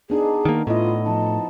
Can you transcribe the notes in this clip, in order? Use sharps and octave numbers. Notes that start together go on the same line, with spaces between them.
B3 D4 D#4 G#4
D#3 A#3
A2 B3 E4 F4 D#5
F3 D#4 A5